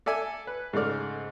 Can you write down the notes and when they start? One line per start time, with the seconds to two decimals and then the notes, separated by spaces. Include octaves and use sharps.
0.06 A4 D5 E5 G#5
0.47 B4
0.73 G#2 C#3 A3 D5 F6